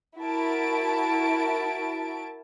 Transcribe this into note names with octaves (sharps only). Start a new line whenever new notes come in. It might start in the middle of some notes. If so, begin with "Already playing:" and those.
E4 F#4 A#4 A5 D7